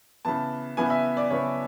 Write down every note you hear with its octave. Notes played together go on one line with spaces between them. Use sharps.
C#3 E3 B3 A5
C#3 E3 B3 G#5
E5
D5
C#3 E3 B3 C#5